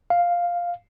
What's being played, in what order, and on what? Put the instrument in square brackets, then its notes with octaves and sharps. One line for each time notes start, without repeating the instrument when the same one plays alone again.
[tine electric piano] F5